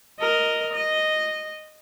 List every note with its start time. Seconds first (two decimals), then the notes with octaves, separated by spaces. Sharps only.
0.20 A#4 D#5
0.73 D#5